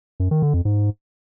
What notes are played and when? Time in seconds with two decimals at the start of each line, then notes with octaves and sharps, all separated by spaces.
0.20 F#2
0.31 D#3
0.42 D3
0.54 F2
0.65 G#2